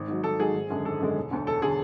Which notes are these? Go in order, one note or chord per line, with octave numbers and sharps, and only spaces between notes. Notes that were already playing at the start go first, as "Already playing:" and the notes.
Already playing: G#1
G#2 F#3
G#1 A4
G#2 F#3 G#4
G#1
F#2 D3 G#3
G#1 A4
F#2 D3 G#3
E1
D2 D3
E1 A4
D3 G#4